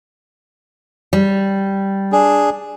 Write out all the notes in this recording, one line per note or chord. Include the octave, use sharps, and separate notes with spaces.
G3
D4 G#4